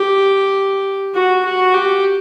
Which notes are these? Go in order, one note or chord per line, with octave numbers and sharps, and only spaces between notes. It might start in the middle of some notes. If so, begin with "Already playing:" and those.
Already playing: G4
F#4
F#4
G4